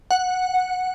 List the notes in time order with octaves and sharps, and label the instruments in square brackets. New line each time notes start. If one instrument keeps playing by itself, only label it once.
[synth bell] F#5